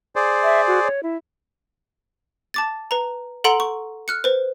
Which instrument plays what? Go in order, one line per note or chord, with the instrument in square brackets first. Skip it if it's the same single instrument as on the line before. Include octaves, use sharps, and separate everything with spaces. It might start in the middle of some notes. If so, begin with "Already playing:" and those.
[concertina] G#4 C5 D5
[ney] E5
F#4
C#5
E4
[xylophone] A5 D6 A6
B4 A#5
A4 F#5 A#5 C6 D7 F#7
C#6
F6 F#6 C#7
B4 C5